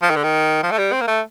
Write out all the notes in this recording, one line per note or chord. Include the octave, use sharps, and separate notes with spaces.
F3
D#3
D3
D#3
F3
A3
G3
C4
A#3
A3